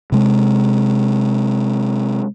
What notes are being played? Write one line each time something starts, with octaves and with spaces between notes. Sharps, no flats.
C3 G#3